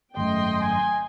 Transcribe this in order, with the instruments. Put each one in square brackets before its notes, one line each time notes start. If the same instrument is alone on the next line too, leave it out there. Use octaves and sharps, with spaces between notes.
[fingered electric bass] G#1 F#2 [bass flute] A3 [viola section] D#5 G5 C6
[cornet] G#5